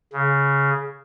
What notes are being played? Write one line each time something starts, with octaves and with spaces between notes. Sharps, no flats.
C#3